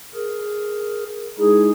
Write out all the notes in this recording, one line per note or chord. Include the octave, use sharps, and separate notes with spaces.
G#4 A#4
G#3 D#4 E4 G#4